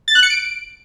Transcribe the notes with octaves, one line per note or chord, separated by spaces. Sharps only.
A6
F#6
C#7
D7